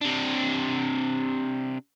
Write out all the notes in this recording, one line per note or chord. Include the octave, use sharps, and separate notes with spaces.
C3 D4